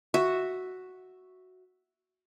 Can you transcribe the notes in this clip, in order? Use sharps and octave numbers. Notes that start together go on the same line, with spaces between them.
F#4 E5